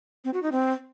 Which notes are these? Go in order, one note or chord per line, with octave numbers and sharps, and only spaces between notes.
C4
F#4
D#4
C4